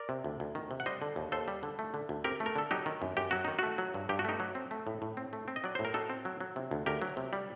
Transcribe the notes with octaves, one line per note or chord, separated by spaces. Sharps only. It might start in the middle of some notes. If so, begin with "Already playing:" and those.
Already playing: A#4 D5
C3
D2
D2
D#3
C3
F#5
G3 C5 D#5
D3
D#2
D#2 A4 C5
G3
D3
A3
D3
D2
C4 G4 A#4
A3
A#4
D3 A4
F#3 D#4 G4
D#3
F#2
F#2 G4
F#3 F#4
D#3 D#4
A3 F#4
F#3
G2
G2 G4
F#4
A3 D#4 G4
F#3
C4
A3
A2
A2
C4
A3
C4
D#5
F#3 D5
A2 C5
A#4
D#4 F#4 A4
C4
F#3
F#3
C3
D2
D2 G4 A#4
F#3
C3
G3